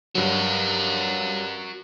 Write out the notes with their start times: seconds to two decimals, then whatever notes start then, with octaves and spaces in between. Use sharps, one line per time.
0.15 G2 F#3 F#4 A#4